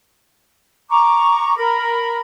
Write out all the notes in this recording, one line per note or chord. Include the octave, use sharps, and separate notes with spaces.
A#5 C#6 D6
A#4 B5